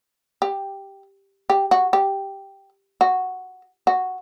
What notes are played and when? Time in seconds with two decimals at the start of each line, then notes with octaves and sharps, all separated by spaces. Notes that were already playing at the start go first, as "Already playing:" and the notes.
0.42 G4
1.50 G4
1.71 F#4
1.93 G4
3.01 F#4
3.87 F#4